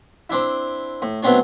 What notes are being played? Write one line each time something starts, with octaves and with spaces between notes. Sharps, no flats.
C4 D4 E4
A2
F#3 A3 B3 C4 D4 C#5